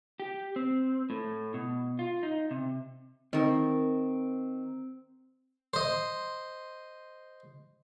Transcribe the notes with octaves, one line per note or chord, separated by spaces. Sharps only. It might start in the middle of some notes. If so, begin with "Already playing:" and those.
G4
C4
A2
B2
F4
D#4
C3
D#3 C4 A#4
C5 D#5